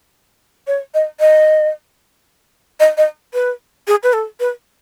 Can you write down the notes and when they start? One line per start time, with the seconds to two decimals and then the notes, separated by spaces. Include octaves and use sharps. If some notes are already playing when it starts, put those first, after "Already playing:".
0.67 C#5
0.94 D#5
1.20 D#5
2.80 D#5
2.97 D#5
3.34 B4
3.87 G#4
4.03 B4
4.13 A4
4.40 B4